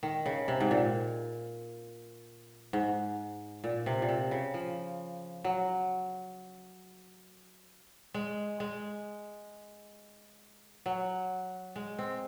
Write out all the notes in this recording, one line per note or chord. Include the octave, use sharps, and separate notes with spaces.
D#3
C#3
C3
G#2
A#2
G#2
A#2
C3
A#2
C3
C#3
F3
F#3
G#3
G#3
F#3
G#3
C4